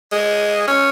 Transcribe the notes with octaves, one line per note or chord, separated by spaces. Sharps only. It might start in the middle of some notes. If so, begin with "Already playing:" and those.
G#3
C#4